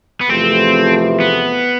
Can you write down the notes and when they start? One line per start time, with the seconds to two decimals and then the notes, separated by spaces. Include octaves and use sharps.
0.21 B3
0.29 E2 C3 F3 A3 C4
1.20 B3